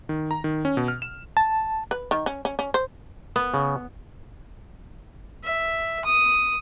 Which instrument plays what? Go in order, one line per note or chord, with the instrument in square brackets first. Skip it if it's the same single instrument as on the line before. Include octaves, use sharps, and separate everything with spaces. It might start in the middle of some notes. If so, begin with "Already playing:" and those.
[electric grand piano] D#3
A#5
D#3
C#4
B2
F6
E7
[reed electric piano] A5
[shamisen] B4
D#3
C#4
C#4
C#4
C5
[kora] B3
[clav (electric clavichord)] C#3
[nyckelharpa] E5
D#6